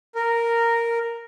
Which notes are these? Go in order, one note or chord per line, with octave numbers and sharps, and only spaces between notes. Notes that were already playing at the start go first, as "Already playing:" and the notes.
A#4